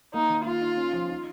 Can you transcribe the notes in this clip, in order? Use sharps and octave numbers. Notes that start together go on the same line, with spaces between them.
A#3 D#4
D#3
A#3 F4
D#4
C#4
F3
D#4